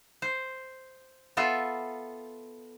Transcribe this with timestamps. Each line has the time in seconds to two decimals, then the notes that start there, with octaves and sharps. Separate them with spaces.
0.22 C5
1.37 B3 F4 A4 E5